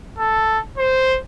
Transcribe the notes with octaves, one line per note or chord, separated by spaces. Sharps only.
A4
C5